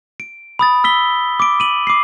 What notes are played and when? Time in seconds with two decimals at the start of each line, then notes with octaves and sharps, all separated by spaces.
0.20 D7
0.59 B5 D#6 A6
0.84 E6 B6 G7
1.40 D6 D7
1.60 D#7 F#7
1.87 D6 C7